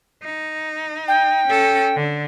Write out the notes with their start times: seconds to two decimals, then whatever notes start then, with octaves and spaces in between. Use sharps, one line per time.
0.23 D#4
1.08 G5
1.48 C#4 A4
1.96 D3